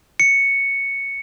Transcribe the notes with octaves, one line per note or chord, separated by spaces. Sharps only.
C#7